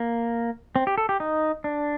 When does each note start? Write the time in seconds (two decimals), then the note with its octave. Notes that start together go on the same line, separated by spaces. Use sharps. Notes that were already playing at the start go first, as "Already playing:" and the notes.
Already playing: A#3
0.76 C4
0.87 G4
0.98 A4
1.09 G4
1.20 D#4
1.64 D4